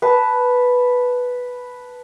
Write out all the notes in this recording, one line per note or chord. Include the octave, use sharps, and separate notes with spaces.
B4 A5